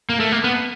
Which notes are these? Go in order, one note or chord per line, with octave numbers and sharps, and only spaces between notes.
A#3
A3
A#3
B3